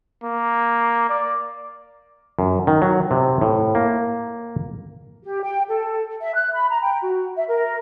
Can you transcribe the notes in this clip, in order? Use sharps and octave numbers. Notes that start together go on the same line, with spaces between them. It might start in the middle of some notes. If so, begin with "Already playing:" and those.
A#3
D5
F#2
D#3
F#3
C3
A2
A#3
G4
G5
A4
E5
F#6
B5
A#5
G5
F#4
E5
A#4